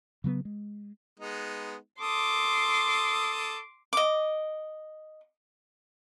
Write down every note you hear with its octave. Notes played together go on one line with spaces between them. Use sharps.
C#3 F#3 A3 B3
G#3
G#3 B3 D#4
A4 C6 D6 D#6
D#5 D6